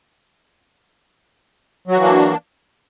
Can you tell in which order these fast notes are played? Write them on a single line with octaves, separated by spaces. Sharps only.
F#3 F#4 E3 A#3 D4